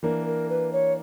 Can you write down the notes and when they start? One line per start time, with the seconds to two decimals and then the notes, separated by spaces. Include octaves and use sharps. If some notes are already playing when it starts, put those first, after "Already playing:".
0.03 E3 A#3 D4 A#4
0.26 A#4
0.49 B4
0.72 C#5